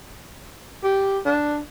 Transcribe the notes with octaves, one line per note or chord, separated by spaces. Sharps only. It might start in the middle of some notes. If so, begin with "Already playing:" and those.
G4
D4